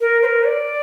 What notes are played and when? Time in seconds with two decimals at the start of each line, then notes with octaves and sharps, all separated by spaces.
0.01 A#4
0.22 C5
0.26 A#4
0.46 D5